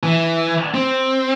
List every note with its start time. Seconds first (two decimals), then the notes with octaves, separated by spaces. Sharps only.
0.03 E3
0.74 C4